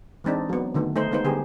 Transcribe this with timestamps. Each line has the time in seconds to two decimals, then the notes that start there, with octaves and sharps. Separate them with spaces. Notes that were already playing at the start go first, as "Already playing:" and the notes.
0.24 E3 G#3 C4 D4 D#4
0.49 F#3 B3
0.74 D3 D#3 A3 B3
0.96 A3 D#4 C5
1.12 G#3 B3 D#4 B4 C5
1.24 D3 G3 B3 G4 G#4